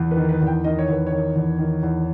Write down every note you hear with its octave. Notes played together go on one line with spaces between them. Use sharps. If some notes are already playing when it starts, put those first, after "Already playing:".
Already playing: E2
B4
D#3
B4
E2
G5
D#3 D#5
C#5
E2 B4
C#5
D#3
E2
D#3
E2